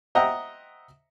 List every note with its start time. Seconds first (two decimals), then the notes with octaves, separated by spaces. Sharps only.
0.15 C5 D#5 E5 F#5 G5 A#5